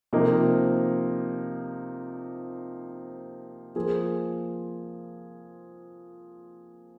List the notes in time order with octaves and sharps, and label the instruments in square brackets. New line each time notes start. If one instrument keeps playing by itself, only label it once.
[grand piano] C3 F3 A#3 D#4
F3 A#3 G#4 C5